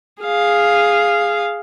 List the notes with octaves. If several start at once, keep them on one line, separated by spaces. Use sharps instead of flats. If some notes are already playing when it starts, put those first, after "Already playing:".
G#4 F5